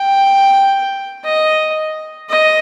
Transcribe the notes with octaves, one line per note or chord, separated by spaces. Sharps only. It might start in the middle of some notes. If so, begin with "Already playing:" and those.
Already playing: G5
D#5
D#5